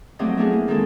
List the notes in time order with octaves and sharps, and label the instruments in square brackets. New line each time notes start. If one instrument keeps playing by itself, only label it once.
[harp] F3 F#3 A3 C4 G4 D#5
A3 B3 D4 E4 G#4 A#4
A#3
D#3 E3 G#3 C4 D#4 A4